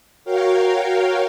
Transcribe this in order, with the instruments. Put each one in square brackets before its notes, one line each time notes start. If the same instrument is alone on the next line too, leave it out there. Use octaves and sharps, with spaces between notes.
[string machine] F#4 A#4 C#5 F5 G5